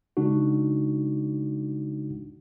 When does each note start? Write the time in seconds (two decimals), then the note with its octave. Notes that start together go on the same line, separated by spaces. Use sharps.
0.17 C#3 G#3 D4 D#4 F#4